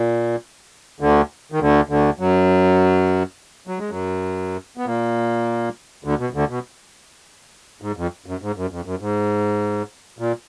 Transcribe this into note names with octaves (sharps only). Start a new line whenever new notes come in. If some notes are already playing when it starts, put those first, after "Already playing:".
Already playing: A#2
D2 D3
D#3
D2 D3
D2 D3
F#2 F#3
F#3
G#3
F#2 F#3
B3
A#2 A#3
D2 D3
B2
D2 D3
B2
G#2
F2
F#2
G#2
F#2
F2
F#2
G#2
A#2